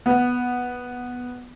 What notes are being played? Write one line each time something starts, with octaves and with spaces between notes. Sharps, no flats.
B3